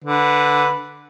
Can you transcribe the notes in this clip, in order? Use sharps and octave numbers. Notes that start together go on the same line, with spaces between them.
D3 B4